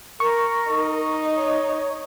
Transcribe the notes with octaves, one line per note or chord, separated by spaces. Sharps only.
A#4 C#6
D#4
C#5